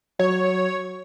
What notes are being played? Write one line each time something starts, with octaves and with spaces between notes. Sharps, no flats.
F#3 C#5